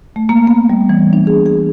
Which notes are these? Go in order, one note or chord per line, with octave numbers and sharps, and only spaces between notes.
A3
A#3
B3
G3
E3
D4
G#4
G#4